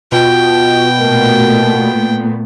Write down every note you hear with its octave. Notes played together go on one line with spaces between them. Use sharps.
B2 F4 G5
A#2 A3 B3 A#4